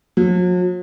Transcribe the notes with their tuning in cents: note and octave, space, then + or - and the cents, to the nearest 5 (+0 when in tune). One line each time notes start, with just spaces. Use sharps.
F#3 -45